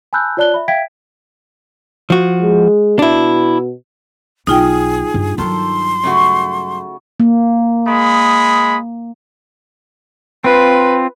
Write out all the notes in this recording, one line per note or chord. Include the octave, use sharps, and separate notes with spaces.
G#5 A5 B5 E6 F#6 G6
F4 C#5 D5 A5 F#6 G7
E5 B5
E5 F5 G5 G#6 B6 D7
F3 F#4
G#3
B2 D4 E4
B1 D#4 F4 G#4 G5
G2
G2 D#3 F#3 A4 C6
C#3 A3 F#4
A#3
G#3 B5 D#6
C4 F4 B4